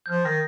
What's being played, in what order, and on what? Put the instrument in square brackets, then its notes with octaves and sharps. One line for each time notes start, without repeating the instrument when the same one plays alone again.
[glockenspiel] G6
[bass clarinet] F3 [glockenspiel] F6
[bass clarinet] D#3 [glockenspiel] F6 A#6